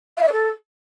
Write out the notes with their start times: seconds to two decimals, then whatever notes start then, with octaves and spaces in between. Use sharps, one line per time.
0.17 F5
0.22 E5
0.27 D5
0.32 A4